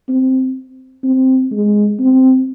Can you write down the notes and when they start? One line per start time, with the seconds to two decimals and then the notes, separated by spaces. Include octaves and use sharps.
0.08 C4
1.03 C4
1.51 G#3
1.99 C4